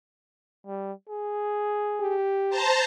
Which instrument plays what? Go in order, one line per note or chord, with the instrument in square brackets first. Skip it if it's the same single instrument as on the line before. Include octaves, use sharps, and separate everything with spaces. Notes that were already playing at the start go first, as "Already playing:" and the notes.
[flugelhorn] G3
G#4
[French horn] G4
[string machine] C5 A5 A#5